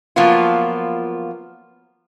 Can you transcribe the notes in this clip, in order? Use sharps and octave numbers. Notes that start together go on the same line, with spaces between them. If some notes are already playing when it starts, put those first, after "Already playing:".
F3 F#3 A#3 B3 F4